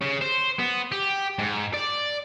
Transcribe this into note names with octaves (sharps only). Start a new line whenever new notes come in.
C#3
C5
B3
G4
G#2
D5